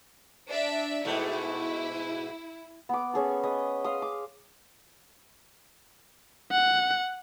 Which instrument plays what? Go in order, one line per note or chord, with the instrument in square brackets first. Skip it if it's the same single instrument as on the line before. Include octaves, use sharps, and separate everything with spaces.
[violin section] D4 D5 E5
[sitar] G#2 B2 A3 [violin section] E4
[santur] B3 D6
C#4 G#4 A4
G#4 B4 D#5
F5 C6 D#6
D6
[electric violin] F#5